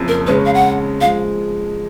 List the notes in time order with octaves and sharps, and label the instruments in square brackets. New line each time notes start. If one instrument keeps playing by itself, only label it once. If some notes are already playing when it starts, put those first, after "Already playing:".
Already playing: [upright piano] F#1 F2 C#3
[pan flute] A#4
[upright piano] C#3 G#3 C#4 [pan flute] B4
[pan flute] F5
F#5
[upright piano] F3 G#3 [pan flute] F5